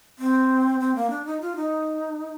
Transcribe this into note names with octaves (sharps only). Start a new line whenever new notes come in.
C4
C4
A#3
D4
D#4
F4
D#4